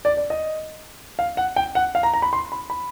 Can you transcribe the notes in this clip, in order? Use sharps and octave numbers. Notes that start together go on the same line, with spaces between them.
D5
D5
D#5
F5
F#5
G5
F#5
F5
A#5
A#5
B5
C6
B5
B5